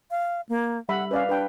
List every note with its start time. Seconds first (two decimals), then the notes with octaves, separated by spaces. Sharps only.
0.11 F5
0.49 A#3
0.89 G3 E5 F#5 B5
1.11 C#4 B4 D5 F5
1.29 D4 B4 G5